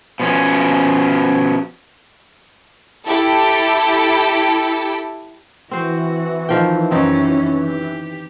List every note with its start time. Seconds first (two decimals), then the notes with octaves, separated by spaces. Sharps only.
0.20 B2 F3 C#4
3.08 E4 G4 A4
5.71 E3 C4 F#4 C5
6.49 D#3 F3 G5
6.91 F#2 C4 C#4 D#4
7.62 G4